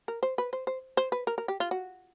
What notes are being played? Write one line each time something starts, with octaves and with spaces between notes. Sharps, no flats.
A#4
C5
B4
C5
C5
C5
B4
A#4
A#4
G4
F4
F#4